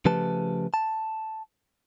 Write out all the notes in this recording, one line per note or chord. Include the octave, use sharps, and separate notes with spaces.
C#3 F3 A3 G4 B4 A5
A5